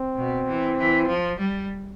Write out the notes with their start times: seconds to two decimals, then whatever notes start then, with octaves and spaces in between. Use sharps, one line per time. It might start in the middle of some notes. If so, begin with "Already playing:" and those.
Already playing: C4
0.17 B2
0.48 E3
0.78 E3
1.08 F3
1.39 G3